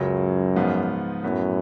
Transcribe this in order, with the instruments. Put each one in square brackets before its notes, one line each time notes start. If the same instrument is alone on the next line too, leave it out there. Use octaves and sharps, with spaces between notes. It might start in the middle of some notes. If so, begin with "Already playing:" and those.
Already playing: [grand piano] C#2 C#3 F#3 [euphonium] F#2
[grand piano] G#2 F3 B3 F4
[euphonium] F#2 [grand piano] A2 F#3 B3